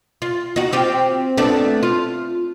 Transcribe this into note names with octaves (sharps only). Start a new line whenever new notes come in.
F4
D#4 F#4
C4 F4 G4
A3 B3 D4
F4